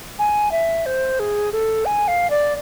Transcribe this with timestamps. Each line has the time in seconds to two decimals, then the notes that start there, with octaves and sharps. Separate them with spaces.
0.19 G#5
0.52 E5
0.86 C5
1.19 G#4
1.52 A4
1.85 G#5
2.08 F5
2.30 D5